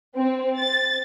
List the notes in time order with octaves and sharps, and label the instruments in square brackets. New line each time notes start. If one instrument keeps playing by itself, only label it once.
[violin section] C4
A6